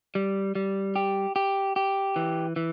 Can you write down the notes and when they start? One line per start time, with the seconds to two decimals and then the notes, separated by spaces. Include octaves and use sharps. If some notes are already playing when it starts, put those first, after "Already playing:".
0.15 G3
0.55 G3
0.96 G4
1.36 G4
1.76 G4
2.16 E3
2.56 E3